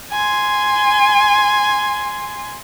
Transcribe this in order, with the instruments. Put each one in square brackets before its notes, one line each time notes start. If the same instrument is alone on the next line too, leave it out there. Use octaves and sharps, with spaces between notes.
[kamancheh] G#5 C6